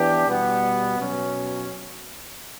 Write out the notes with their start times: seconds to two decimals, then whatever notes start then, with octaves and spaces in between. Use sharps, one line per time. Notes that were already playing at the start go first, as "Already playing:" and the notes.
Already playing: E3 B3 D4 G4
0.27 B2 G3 B3
0.99 B2 F#3 C#4